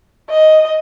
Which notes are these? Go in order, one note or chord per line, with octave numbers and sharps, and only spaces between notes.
D#5